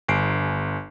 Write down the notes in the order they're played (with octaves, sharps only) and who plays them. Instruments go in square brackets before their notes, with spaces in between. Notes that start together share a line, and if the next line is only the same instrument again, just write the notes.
[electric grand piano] G1 C7 D7